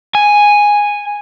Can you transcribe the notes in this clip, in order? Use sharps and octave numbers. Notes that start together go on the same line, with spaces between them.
G#5